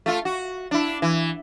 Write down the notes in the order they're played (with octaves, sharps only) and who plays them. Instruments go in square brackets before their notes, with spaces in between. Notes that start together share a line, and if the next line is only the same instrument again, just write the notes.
[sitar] A3 F4
F#4
D4 E4
E3